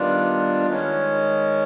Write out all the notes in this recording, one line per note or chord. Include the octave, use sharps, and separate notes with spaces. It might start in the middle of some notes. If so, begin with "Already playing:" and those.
Already playing: D#3 G3 B3 D4 F4
D#3 G#3 C#4